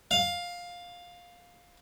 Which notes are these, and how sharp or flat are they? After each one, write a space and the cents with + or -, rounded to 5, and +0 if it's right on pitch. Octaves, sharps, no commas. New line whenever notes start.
F5 +10